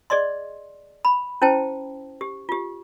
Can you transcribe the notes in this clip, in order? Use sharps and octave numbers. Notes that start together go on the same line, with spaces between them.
G#4 D5 D#5 C6
B5
C#4 E4 C5 G5 A5
G4
F4 G4